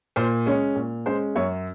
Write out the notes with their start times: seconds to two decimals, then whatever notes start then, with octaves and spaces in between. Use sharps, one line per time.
0.16 A#2 C5
0.46 G#3 C#4 C#5
0.76 A#2
1.06 G#3 C#4 C5
1.35 F#2 C#5